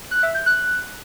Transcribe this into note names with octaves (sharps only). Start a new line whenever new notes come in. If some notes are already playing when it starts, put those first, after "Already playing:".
F#6
E5
G6
F#6